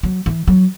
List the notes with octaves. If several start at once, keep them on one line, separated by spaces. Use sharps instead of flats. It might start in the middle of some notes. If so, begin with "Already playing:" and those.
F#3
E3
F#3